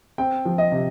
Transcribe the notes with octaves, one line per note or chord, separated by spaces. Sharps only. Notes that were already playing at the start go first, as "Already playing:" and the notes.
C4 G5
F3
D#5
C3